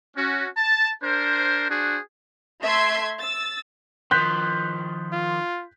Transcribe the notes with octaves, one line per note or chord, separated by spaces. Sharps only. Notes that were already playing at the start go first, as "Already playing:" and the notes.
C#4 F#4
A5
D4 A#4 C5
D4 F#4 G#4 C5
A3 E5 C6 G#6
E6 A6
D#3 F3 C6 F#6 G6 B6
F4